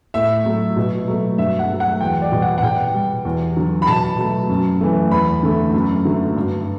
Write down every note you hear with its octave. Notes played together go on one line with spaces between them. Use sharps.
A2 E5
F#3 A3
B2
F#3 A3
G2 E5
F#5
F#3 A3
F#5
E2 G5
D5
B2 G3
F#5
F#5
B2 G5
G3
E2
D3 F#3
B5
B2 A5
F#3 A3
F#2
E3 A3
E2 B5
D3 A3
F#2
D3 F#3 A3
G2